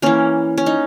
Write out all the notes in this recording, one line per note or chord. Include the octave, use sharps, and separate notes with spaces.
E3 A#3 C#4
C#4
D#4